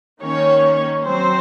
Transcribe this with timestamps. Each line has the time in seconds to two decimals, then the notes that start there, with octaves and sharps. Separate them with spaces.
0.21 D#3 A#3 C#4 C#5
1.04 F#3 C4 C5